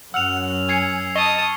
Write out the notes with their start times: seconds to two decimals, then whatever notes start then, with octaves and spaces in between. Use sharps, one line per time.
0.14 F#2 F#3 F#5 E6 F6 F7
0.69 G#5 G#6 C7 C#7
1.16 D#5 A5 C#6 D#6 C7 G7